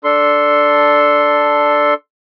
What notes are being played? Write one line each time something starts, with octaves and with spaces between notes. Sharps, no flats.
D4 A4 C6